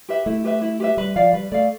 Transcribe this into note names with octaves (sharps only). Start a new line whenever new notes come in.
G4 B4 E5
A3 E4
G4 B4 E5
E4
G4 B4 E5
G3 B4
F3 D5 F5
G3 B4
A3 D5 F5